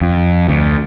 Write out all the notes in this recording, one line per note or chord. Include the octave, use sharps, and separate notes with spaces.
F2
D2